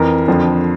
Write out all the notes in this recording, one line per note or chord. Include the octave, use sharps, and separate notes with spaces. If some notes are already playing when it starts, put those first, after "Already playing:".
Already playing: F2 E3 A#4
F2 D3 F3